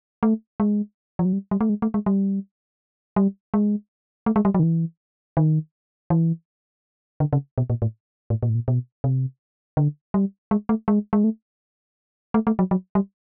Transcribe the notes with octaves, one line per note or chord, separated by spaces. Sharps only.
A3
G#3
F3
F#3
G3
G3
A3
G#3
A3
G#3
G3
G3
G#3
A3
G#3
G3
F#3
D#3
E3
D#3
E3
D3
C#3
B2
A#2
A2
A2
A#2
A2
A#2
B2
C3
D3
G3
G#3
A3
G#3
G#3
A3
A3
A3
F#3
F#3
G3